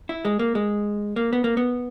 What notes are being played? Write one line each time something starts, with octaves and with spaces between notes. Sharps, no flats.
E4
G#3
A#3
G#3
A#3
B3
A#3
B3